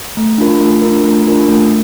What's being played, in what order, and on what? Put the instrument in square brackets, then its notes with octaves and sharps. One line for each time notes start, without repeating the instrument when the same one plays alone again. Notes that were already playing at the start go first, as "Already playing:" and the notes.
[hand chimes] A3
D4 F4 A#4
A3
D4 F4 A#4
A3
D4 F4 A#4
A3